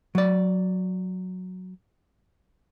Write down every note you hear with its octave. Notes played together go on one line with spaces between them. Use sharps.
F#3 D5